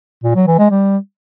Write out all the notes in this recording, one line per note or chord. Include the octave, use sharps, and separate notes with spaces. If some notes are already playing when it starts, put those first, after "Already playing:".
A#2
F#3
E3
G#3
G3